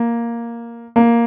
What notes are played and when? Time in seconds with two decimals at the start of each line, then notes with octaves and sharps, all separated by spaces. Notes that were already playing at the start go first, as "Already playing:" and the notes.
Already playing: A#3
0.96 A#3